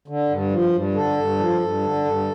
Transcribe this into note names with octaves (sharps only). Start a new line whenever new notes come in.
D3
G2
F3
G2
D3 A4
G2
F3
G2
D3
G2